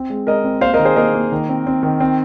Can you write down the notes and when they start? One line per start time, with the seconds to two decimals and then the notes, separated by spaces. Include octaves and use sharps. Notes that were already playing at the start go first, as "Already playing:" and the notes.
Already playing: C4
0.10 G#3
0.27 G#3 A#4 D#5
0.44 C4
0.61 A#3 C5 F5
0.74 A#4 D#5
0.79 D#3
0.85 G#4 C5
0.96 A#3 A#4 D#5
1.13 A#3
1.32 D#3
1.49 C4
1.67 C4
1.83 D#3
2.00 C4